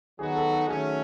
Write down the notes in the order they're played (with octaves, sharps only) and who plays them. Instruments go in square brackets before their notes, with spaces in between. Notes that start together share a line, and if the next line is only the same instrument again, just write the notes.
[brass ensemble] D#3 F#3 B3 D#4 F#4 [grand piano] G#4
[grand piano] A4
A4
[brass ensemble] D#3 F#3 A3 C#4 [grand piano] G#4